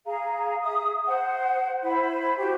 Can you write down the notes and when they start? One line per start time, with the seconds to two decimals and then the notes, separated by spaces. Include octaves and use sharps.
0.06 G#4 F5 A#5
0.63 G#4 E5 D#6
1.06 C5 F#5
1.83 E4 C5 B5
2.38 F#4 G4 C5